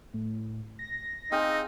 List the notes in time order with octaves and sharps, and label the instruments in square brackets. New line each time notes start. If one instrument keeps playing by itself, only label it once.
[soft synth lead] A2
A#6
[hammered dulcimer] C4 G#4 F5 [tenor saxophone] D#4